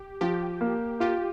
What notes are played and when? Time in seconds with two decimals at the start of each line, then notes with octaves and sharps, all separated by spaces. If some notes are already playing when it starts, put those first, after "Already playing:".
Already playing: G4
0.21 F3 G4
0.61 A#3
1.00 F4 G4